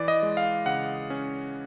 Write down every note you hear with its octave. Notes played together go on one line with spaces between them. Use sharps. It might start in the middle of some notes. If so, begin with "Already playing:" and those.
Already playing: E3 D5
D#5
G#3
F5
C#3 F#5
C#4